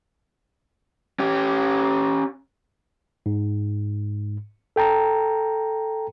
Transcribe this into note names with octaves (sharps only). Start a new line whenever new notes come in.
C#4 G4
G#2
A4 G5 A5 A#5